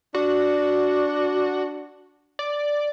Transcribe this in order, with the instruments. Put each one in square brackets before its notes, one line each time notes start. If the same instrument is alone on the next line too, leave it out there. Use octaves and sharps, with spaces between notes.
[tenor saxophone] D4 [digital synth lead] F#4
[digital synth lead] D5